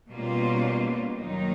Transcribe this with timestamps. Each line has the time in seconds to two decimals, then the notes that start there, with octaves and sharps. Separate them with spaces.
0.10 B2 G3 A#3 C#4 F4
1.19 D#2 D#3 F#3 A#3 D#4